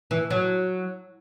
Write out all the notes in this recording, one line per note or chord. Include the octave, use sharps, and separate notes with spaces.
E3
F#3